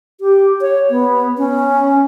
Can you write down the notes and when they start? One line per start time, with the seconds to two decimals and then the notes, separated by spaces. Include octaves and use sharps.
0.21 G4
0.61 C#5
0.90 B3
1.38 C#4